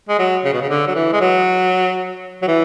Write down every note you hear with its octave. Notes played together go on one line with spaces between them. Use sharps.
G#3
F#3
C#3
B2
C#3
D3
F#3
E3
G#3
F#3
F#3
E3